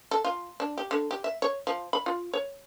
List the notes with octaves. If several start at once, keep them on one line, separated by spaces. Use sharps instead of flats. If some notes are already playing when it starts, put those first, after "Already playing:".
A4
F4
D4
G4
D3
G4
E5
C#5
F3
B5
F4
C#5